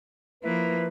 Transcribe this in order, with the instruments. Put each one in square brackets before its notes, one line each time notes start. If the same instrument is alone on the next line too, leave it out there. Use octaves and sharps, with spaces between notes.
[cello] F3 A#3 [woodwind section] E4 B4